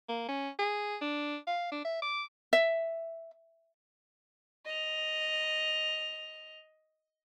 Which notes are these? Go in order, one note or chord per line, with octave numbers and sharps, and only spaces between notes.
A#3
C#4
G#4
D4
F5
D4
E5
D6
E5
D#5 F7